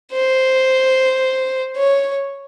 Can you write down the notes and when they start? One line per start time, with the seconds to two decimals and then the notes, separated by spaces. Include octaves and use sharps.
0.12 C5
1.76 C#5